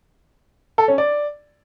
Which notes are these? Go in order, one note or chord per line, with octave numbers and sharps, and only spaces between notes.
A4
C#4
D5